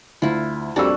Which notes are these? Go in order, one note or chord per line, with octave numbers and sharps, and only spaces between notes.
D2 E4 F4
F2 A#2 G3 D4 F#4 A4 E6